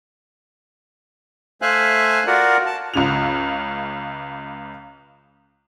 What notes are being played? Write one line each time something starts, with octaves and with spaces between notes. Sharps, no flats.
A3 C5 E5 F5 G#5 F#6
F4 F#4 A#4 D5 F#5
A5
C#2 C#3 F7